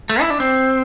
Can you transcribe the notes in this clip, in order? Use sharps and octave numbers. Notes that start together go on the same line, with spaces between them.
A3
E4
D4
C4